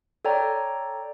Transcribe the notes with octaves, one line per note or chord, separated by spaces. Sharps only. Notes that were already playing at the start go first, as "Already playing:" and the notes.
A4 C#5 D5 G5 A#5